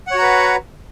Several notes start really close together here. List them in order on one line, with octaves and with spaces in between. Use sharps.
F#5 C#5 F#4 A#5 B4